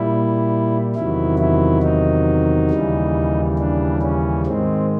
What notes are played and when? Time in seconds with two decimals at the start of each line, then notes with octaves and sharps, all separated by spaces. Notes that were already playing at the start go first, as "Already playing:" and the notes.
Already playing: A#2 G3 E4
0.96 E2 C3 D#3 F#3 E4
1.39 E4
1.83 D#4
2.71 D#2 C#3 E3 G3
3.59 D4
4.02 C#4
4.46 G#2 D#3 G#3 C4